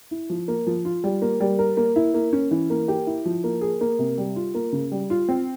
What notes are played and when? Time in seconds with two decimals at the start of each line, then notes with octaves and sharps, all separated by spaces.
0.11 E4
0.30 F3
0.48 A#3
0.67 F3
0.85 F4
1.04 G3
1.22 A#3
1.40 G3
1.59 A#4
1.77 A#3
1.96 E4
2.14 A#3
2.33 C#4
2.51 E3
2.70 A#3
2.88 G4
3.07 E4
3.25 F3
3.44 A#3
3.61 G#4
3.81 A#3
3.99 C3
4.18 G3
4.36 F4
4.55 A#3
4.73 C#3
4.92 G3
5.10 F4
5.29 C4